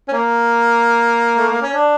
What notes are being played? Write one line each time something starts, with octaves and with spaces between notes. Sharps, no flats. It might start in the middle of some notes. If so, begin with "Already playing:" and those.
C#4
A#3
A3
A#3
C#4
D4